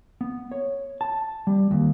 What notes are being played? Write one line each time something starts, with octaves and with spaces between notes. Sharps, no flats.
B3
C#5
A5
G3
D#2